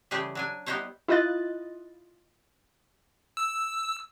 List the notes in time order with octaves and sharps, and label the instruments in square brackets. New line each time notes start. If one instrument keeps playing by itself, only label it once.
[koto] C#3 E3 G3 A3 G4 G#4
F#3 D4 G#5
G3 B3 D#4 E4 C5 C#5
[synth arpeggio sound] E4 F4 D#5 F#6 A6
[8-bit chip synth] E6